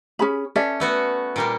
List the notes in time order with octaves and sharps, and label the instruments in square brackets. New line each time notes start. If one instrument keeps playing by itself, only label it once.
[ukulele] C#4 G#4 B5
[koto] C#4 [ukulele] A4 D5 E5
[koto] A3 B3 F#4
A#2 G3 A#3